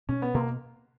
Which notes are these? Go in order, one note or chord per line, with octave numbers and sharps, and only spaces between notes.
B2 C#4
B3
B2 A#3